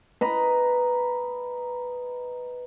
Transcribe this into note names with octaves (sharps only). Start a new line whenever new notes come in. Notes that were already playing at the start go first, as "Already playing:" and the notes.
B4 D#5 A#5